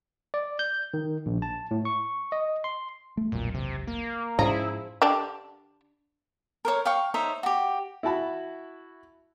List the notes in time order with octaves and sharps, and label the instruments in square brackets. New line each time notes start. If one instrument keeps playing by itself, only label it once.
[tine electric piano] D5
G6
D#3
A#1
A5
A2
C#6
D#5
C6
[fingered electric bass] A3
[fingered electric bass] E1 B1 F#2 [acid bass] A#2
[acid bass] C3
A#3
[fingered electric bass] G#2 C#4 [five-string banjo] F3 G#4 A#5 [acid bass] E4
[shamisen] D3 D4 G4
[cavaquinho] A#4 C5 C#5
F5 G5 C#6
D#4 C5 C#5 E5
F#4 G4
[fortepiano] E4 F#4 A5 B5